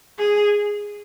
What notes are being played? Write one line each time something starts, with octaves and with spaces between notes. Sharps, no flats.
G#4